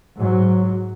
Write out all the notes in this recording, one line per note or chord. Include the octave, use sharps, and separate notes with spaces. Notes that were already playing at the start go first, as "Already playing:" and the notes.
G#2 F#3